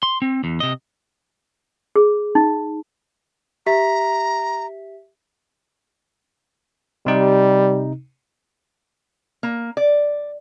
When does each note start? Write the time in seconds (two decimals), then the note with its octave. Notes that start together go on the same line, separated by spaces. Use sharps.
0.03 C6
0.22 C4
0.44 E2
0.60 C3 D#5
1.96 G#4
2.35 D#4
3.66 G4 E5 A#5 B6
7.06 C3 G3 D#4
9.43 A#3
9.77 D5